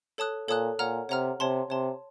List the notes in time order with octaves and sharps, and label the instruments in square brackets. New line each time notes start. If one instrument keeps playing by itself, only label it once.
[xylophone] A4 C#5 A5 D#6 F#6
[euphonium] A#2 [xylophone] A4 C#5 A5 D#6 F#6
[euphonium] A#2 [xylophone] C#5 F#5 A#5 F6
[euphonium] C3 [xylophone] C#5 F#5 A#5 F6
[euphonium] C3 [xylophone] C#5 A5 C6
[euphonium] C3 [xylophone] C#5 A5 C6